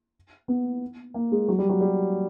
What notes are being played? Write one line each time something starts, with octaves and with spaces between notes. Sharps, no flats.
B3
A#3
G#3
F#3
G3
F#3
G3